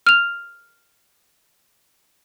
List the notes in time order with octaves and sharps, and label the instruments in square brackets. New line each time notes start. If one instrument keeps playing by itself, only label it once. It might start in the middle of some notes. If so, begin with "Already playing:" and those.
[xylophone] F6 F7